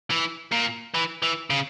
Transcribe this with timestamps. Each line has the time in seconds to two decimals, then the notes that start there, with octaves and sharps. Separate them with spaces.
0.10 E3
0.52 A#2
0.94 E3
1.23 E3
1.50 C#3